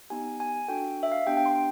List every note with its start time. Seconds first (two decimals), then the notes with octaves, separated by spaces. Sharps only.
0.10 B3 D#4 G4 G#5
0.40 G#5
0.68 D4 F#4 A4 G5
1.03 E5
1.12 F5
1.26 B3 D4 G4 G5
1.37 G5
1.46 C6